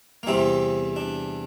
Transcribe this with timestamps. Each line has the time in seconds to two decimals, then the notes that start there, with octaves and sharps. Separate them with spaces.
0.23 A#3
0.27 E2 C3 E3 G3 C4
0.96 D4